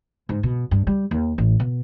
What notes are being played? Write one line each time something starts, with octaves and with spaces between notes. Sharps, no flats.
G#2
B2
G2
G3
D#2
A1
B2